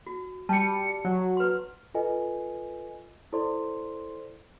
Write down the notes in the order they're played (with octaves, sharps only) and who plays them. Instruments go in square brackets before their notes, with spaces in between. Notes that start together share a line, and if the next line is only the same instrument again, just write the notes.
[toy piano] F#4
[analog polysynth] G3 C#7 [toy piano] A5
[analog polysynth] F#3
[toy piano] B4 C6
[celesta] F4 A4 B4 D#5 G#5
E4 A4 C5 D5 C6